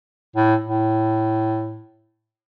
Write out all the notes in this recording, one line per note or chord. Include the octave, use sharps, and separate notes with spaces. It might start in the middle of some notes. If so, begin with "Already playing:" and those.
A2
A2